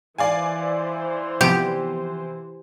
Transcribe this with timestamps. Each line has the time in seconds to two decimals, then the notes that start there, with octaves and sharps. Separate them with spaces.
0.18 E3 C5 D5 F5 G#5
1.41 C3 F3 B3 G4